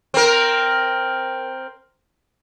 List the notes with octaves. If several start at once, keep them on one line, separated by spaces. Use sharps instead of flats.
C4 A#4